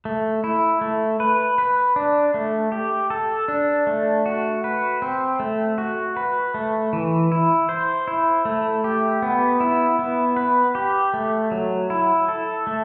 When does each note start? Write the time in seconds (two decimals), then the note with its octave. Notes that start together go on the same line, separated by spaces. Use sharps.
0.05 A3
0.44 E4
0.81 A3
1.20 B4
1.58 B4
1.96 D4
2.34 A3
2.72 G4
3.10 A4
3.48 D4
3.87 A3
4.26 F#4
4.64 B4
5.02 C4
5.40 A3
5.78 F#4
6.17 B4
6.54 A3
6.93 E3
7.32 E4
7.69 C5
8.08 E4
8.45 A3
8.84 G4
9.22 B3
9.60 E4
9.99 B3
10.37 B4
10.75 G4
11.14 A3
11.52 F#3
11.90 E4
12.28 A4
12.67 A3